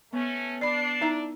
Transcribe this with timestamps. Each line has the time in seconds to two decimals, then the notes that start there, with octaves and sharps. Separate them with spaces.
0.13 A3 B3 C#4
0.61 D4 D5 B5 C7
1.01 D#4 E4 E5 A#5